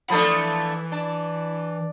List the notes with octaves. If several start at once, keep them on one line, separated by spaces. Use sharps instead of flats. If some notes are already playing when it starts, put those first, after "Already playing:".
E3 F3 A3 D4 B5
D4